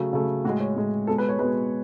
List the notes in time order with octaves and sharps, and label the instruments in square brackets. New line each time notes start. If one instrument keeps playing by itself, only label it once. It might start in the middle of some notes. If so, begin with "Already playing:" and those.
Already playing: [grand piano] C#3 F#3 A3
C#3 F#3 A3
A2 F#4
G#3
C#5
A2 G#3
B2 G#3 A4
B4
C#5
B2 G#3 B4